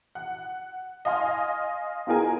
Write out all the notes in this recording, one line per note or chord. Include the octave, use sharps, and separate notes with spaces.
F#5
D#5 F5 G#5 C6 F6
B3 F4 G#4 A#4 G#5